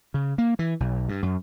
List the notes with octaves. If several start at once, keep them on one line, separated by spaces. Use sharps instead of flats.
C#3
A#3
E3
B1
G2
F#2